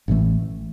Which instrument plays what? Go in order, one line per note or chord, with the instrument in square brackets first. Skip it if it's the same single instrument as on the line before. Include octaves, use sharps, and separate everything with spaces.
[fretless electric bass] A1 A2 E3 A3